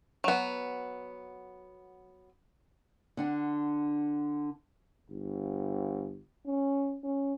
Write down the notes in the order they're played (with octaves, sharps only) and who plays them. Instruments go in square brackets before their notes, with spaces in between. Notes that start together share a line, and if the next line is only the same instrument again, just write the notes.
[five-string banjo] F#3 B3
[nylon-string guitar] D3 D4 F#5
[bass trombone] G1
C#4
C#4